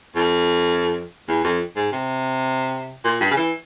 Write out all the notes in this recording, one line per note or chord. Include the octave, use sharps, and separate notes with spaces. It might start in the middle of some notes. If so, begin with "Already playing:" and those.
F2
E2
F2
G#2
C3
A#2
G2
C#3
E3